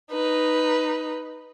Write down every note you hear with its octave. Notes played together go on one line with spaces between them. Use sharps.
D#4 B4